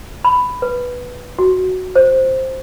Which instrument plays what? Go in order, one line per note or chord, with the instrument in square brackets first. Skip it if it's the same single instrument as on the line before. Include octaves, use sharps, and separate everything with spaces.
[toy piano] B5
B4
F#4
C5